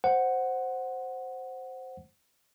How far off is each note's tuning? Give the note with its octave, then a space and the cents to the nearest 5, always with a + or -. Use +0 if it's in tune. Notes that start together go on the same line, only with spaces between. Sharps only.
C5 +0 F#5 +0